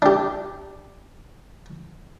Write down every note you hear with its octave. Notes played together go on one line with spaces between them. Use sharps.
D4 G4